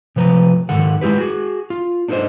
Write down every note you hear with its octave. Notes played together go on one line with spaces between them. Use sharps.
C3 F3 B4 A#5
G#2 D#3 A4 F#5
G#3 E4 G4 B4
F#4 G#4
F4
D4 D#4 A4 A#4 C5 D#5